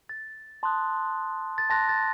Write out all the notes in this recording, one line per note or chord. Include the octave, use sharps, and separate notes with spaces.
A6
A5 C6 D#6 F#6
A6
A5 C6 F#6 A#6
A6